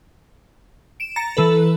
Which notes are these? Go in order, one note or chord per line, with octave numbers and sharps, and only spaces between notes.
D7 E7
A#5 A6 C#7
E3 A4 B4